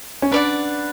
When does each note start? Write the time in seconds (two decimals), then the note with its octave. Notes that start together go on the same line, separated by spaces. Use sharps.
0.22 C#4
0.32 D4 B4 D5 F#5